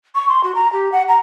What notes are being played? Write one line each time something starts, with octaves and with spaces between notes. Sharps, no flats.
C#6
C6
F#4
A#5
G4
F#5
A#5